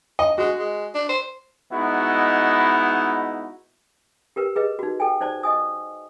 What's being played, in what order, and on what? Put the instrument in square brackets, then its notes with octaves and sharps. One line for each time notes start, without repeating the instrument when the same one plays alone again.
[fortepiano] D#5
[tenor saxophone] G#3 [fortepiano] F#4
[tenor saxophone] G#3
D4
C5
[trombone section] G#3 B3 D#4 E4 F#4
[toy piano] G4 A#4 B4
G#4 B4 D#5
D#4 F#4
A4 G5 G#5
D#4 C5 D5 A5
D#5 G#5 D#6